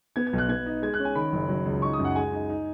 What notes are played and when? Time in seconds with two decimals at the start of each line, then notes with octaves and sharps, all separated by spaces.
0.16 B3 G#6
0.27 G#6
0.33 B1
0.38 F#6
0.49 B3 G#6
0.66 D#4
0.82 G#3 G#6
0.94 F#6
1.00 C#4
1.05 G#5
1.15 D#3 B5
1.33 F#1
1.49 F#3
1.66 C#2
1.82 D#4 C#6
1.93 D#6
1.99 F#2
2.05 F#5
2.16 G#3 G#5
2.33 D#4
2.49 D#4